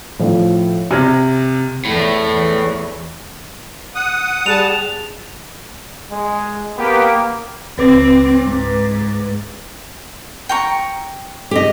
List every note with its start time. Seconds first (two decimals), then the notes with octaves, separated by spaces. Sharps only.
0.19 A2 F3
0.91 C3 F6 G#6 A#6
1.85 E2 A2
2.26 E2 E3
3.95 F#5 D#6
4.46 G3 G#4 A5 F7
6.11 G#3
6.78 A#3 B3 G4
7.78 C#2 C4 B4 D6
8.43 G#2
10.49 G5 A#5 C#6
11.51 G4 D#5